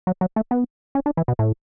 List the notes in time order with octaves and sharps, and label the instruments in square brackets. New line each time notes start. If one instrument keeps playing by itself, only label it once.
[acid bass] F#3
F#3
A3
B3
C#4
D4
E3
B2
A2